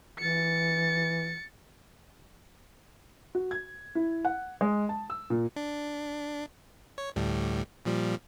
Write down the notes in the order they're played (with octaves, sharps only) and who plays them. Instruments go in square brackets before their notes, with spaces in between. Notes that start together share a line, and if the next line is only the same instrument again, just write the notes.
[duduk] E3 [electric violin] A6 C#7
[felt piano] F#4
G#6
E4
F#5
G#3
A5
E6
A#2
[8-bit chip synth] D4
C#5
D2 A2 G3
A#2 F3 G3